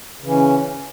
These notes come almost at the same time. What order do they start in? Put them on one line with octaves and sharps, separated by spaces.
C#3 E3 C#4